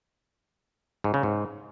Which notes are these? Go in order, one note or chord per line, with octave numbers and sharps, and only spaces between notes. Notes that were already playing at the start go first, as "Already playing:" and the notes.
G#2
C#3
G#2